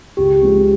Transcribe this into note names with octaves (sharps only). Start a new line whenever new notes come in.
C#2 G4
C#3 F3 G#3 C4